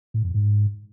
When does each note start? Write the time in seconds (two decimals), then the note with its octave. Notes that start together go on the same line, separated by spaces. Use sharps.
0.14 A2
0.24 F2
0.34 G#2